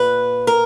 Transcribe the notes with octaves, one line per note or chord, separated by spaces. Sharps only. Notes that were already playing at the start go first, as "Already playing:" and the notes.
Already playing: A#2 B4
A#4